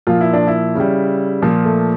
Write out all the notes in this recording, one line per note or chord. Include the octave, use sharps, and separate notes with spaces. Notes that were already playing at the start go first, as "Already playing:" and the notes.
A#2 F3 F4
E4
D4
E4
C#3 G3
A#2 F3
A3